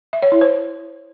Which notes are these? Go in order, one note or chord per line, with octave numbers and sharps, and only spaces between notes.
E5
C#5
E4
C5